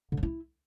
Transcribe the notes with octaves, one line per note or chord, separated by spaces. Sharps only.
D3
F#3
E4